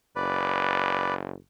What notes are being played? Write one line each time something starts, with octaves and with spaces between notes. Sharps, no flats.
F#1 B4 D5